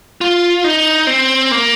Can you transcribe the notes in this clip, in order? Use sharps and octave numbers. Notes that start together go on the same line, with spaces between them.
F4
D#4
C4
A#3